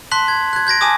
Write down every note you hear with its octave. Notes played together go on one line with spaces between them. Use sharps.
A5 C6 F#6 B6 F#7
G#6
F#6 G#6
G6 G#6 A#6 D7
G#5 A5 D6 D#6